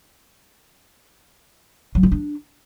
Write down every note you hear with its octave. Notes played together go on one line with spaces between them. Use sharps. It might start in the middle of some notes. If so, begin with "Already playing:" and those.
F#3
F4
D4